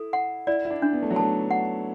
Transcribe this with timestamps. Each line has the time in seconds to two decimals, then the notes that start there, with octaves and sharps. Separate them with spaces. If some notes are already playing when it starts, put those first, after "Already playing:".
Already playing: E4 A4
0.13 F#5
0.47 E4 D5
0.65 E4
0.70 D4
0.82 D4
0.93 B3
1.02 A3
1.10 F#3
1.16 A3 A5
1.51 F#5